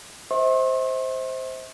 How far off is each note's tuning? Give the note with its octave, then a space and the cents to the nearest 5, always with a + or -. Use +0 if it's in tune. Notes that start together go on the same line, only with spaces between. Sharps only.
C5 +0 E5 -45 C6 +45